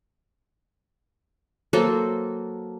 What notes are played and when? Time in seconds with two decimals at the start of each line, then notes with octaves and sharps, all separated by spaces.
1.73 F#3 A#3 A4 C5